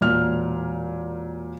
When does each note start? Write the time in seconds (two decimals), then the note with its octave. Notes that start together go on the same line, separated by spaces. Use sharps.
0.01 E1 A#2 F6